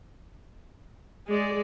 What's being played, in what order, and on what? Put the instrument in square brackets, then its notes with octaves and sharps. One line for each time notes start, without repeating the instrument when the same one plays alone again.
[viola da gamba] G#3 [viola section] G#4 D5